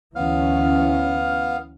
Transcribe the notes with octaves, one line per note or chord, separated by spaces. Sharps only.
D2 E3 B3 C#4 F5 F6